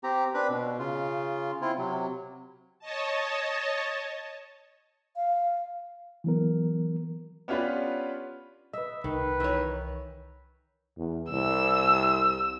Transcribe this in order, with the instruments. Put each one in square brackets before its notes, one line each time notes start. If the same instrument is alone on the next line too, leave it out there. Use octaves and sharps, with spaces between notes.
[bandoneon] C4 G4 A#5
C4 D4 B4 B5
B2
C#3 F4
C4 E4 F4
C3 F#3
[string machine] C#5 D#5 A5
[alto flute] F5
[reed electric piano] E3 F#3 B3 A#4
[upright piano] B3 C#4 D4 F4 G4 B4
[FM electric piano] B4 D#5 [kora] E5
[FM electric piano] C2 [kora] D#3 [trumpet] B4
[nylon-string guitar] D#3 C#5 [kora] E3 E5
[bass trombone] E2
[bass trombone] C2 [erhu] E6